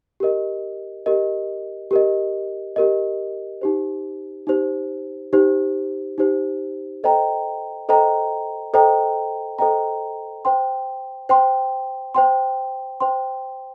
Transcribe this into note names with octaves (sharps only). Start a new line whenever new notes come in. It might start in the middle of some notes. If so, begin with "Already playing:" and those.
G4 A#4 D#5
G4 A#4 D#5
G4 A#4 D#5
G4 A#4 D#5
D#4 G4 C5
D#4 G4 C5
D#4 G4 C5
D#4 G4 C5
A4 C5 D#5 G5 A#5
A4 C5 D#5 G5 A#5
A4 C5 D#5 G5 A#5
A4 C5 D#5 G5 A#5
C5 G5 C6
C5 G5 C6
C5 G5 C6
C5 G5 C6